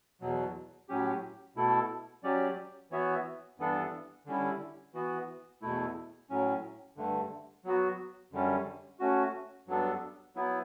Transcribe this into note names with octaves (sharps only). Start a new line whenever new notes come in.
E2 B2 F#3
A2 F#3 C#4 G4
B2 A3 E4 A4
F#3 C#4 G4 D5
E3 B3 F#4 C#5 E5
G2 E3 B3 D4 A4
D3 G3 C#4 E4
E3 B3 F#4
E2 B2 A3 E4
A2 F#3 C#4
G2 D3 A3
F#3 B3 F#4
F#2 D3 G3 C#4
A3 C#4 F#4
G2 F#3 B3 D4 A4
F#3 B3 E4